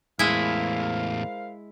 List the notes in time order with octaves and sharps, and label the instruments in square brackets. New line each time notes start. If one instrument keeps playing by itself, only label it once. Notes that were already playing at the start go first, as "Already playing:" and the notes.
[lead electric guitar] E2 A2 [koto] G#3 E4 [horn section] A#4 C5 F5